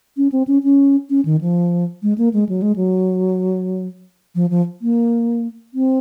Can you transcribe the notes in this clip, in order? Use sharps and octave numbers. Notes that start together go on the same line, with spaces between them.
C#4
C4
C#4
C#4
C#4
D#3
F3
G#3
A#3
G#3
F#3
G#3
F#3
F3
F3
A#3
C4